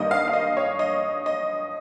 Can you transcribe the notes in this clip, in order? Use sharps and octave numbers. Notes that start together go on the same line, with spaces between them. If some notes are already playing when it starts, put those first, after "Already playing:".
Already playing: G2 D#3 G3 A#3 D#5
F5
F5
D#5
C#5
D#5
D#5